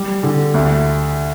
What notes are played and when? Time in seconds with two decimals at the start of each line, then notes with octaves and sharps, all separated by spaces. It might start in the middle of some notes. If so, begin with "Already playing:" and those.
Already playing: G3
0.23 D3
0.54 D2